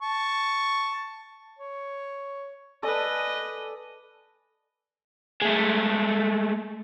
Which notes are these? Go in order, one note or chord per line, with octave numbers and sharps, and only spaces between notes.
A5 C#6
C#5
A4 B4 D5 D#5 G#5
G#3 A3